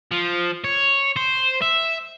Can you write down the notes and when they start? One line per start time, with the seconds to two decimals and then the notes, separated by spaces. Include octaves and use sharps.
0.11 F3
0.64 C#5
1.16 C5
1.62 E5